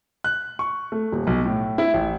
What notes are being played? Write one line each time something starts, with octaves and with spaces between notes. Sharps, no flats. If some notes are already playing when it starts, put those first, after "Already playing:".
F#6
C#6
A3
D#1
B1
A2
E4
A1